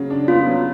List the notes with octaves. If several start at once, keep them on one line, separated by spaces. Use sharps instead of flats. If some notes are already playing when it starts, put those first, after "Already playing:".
Already playing: C#3 F#3
D4
B3 F4
F#3